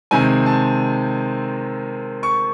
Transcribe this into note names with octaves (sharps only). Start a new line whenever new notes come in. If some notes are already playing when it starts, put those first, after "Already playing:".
C3 D#3 G#3 C4 G#5
A5
C#6